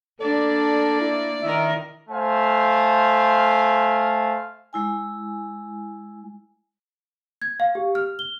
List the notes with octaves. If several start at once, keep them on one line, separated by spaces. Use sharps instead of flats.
A#3 D4 A4 D5
E4
D#3 E4 A#4 E5
A3 C5 F5 G#5
G#3 E4 G#5
G#6
F5
G4
F6
G7